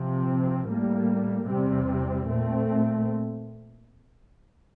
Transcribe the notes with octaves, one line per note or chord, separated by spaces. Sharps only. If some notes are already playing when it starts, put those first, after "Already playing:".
Already playing: C3 F3 C4
A2 G3 A#3
E2 C3 G3 C4
A#2 A3 C4